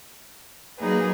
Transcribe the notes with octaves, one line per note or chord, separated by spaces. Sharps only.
F#3 A#3 D#4 G#4 B4